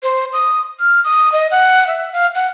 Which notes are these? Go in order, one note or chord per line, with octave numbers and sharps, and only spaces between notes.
C5
D#6
F6
D#6
D#5
F#5
E5
F5
F#5